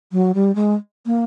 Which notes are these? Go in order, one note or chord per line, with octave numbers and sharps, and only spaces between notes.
F#3
G3
G#3
A#3